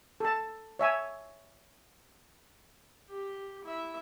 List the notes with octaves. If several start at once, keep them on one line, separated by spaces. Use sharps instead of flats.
A4 A5
C#5 E5 G#5
G4
E4 E5